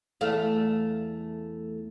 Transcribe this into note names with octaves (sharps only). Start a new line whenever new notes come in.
E2 A3 F5